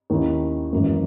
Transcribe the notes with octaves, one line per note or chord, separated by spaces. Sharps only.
D#2 D#3 A#3 C#4 E4
G#1 F#2 E3 A#3